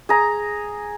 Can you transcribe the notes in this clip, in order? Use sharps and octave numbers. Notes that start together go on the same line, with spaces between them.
G#4 A#5